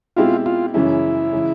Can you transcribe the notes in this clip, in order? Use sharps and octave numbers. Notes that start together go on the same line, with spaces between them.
B2 G#3 C4 E4 F4 G4
F4
F#2 C#3 E3 G#3 C#4 E4
C#3 E3 G#3